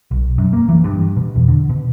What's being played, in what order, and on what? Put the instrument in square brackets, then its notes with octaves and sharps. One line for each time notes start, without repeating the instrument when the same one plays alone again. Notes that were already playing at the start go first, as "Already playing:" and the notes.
[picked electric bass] B1
F#2
A#3
E3
G2
B2
E2
D3
B2